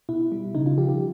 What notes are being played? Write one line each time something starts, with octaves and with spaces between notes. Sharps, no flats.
B2 E4
G3
C#3 D#4
F4
F3 G4
G4